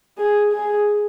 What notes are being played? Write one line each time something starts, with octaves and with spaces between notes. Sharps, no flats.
G#4
G#4